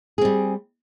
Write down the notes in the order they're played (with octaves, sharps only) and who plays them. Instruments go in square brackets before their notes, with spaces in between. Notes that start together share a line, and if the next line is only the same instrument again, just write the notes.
[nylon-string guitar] G#4
C4
G3